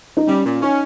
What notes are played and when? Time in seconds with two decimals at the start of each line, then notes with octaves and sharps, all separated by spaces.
0.17 D#4
0.27 G3 C#4
0.45 A#2
0.62 C#4 D#4